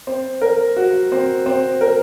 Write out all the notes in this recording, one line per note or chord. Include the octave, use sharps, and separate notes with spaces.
C4
A#4
F#4
C4
C4
A#4